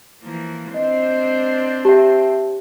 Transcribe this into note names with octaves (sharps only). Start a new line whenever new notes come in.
E3 F3 A#3
C4 D4 C5 D#5
G4 E5 G5 A5